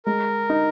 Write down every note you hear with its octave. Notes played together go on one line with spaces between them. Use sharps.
G#3 A#4
D#4